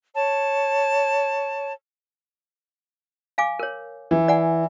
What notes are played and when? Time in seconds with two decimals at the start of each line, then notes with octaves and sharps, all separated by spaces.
0.14 C#5 A5
3.38 F5 G#5 D6
3.59 A#4 C#5
4.11 E3
4.28 D5 F#5 G#5